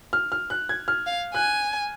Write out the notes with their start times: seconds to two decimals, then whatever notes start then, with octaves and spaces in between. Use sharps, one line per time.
0.13 F6
0.32 F6
0.50 F#6
0.69 G#6
0.88 F6
1.07 F5
1.35 G#5 F#6